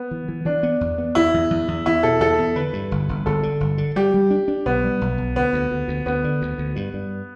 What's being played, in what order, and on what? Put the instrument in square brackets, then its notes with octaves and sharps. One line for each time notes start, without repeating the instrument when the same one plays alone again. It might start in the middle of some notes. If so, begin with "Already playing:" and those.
Already playing: [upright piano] B3
[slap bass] E3
E3
[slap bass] E3 [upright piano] D4
[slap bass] B3
E2
B3
[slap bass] E2 [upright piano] E4
[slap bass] E2
E2
E2
[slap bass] E2 [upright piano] E4
[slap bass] B2 [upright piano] A4
[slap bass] E2 [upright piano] A4
[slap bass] E2
[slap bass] D3 [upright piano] B4
[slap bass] G2
G1
G1
[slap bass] G1 [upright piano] A4
[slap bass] D3
G1
D3
[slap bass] G3 [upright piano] G4
[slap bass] G3
D4
D4
[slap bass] B1 [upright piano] B3
[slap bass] G3
B1
B1
[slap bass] D2 [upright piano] B3
[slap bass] D2
D2
D2
[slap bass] D2 [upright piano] B3
[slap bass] D3
D2
D2
G2
G2